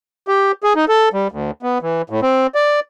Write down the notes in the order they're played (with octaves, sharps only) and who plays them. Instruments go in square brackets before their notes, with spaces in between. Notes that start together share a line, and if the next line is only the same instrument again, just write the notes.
[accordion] G4
G#4
D#4
A4
G3
D2
B3
E3
A2
C4
D5